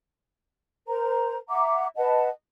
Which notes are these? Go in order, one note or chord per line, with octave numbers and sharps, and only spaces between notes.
A#4 C5 A#5
E5 F#5 A#5 D6
B4 D#5 F#5 A5